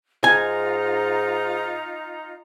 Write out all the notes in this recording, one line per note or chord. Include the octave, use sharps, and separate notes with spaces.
G#2 D#4 F4 G#5 A#5